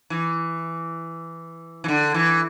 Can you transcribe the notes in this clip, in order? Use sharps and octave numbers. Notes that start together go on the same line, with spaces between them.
E3
E3
D3
E3